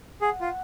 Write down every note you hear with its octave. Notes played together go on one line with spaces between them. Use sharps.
G#4 F#5
F4